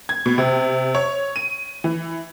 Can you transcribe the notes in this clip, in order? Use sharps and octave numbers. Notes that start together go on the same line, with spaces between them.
G#6
B2
C3
C#5
D#7
E3